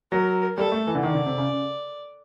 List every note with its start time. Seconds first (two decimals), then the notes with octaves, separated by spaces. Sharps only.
0.11 F#3 A#4
0.57 G3 A4
0.72 A3
0.87 E3
0.95 D3
1.02 D#3 D5
1.14 D3
1.26 C3
1.38 C#3
1.49 C#3